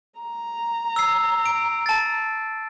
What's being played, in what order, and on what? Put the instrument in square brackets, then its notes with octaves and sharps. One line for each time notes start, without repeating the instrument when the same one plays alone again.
[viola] A#5
[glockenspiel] E6 C7
D7
A5 A6